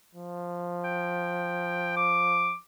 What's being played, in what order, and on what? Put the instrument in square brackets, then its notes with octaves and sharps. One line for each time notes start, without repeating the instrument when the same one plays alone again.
[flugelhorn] F3
[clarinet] G5
D6